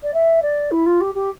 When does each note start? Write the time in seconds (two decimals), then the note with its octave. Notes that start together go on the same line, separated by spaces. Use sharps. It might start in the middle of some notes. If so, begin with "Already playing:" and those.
0.03 D5
0.13 E5
0.42 D5
0.71 E4
0.86 F4
1.00 G4
1.14 G4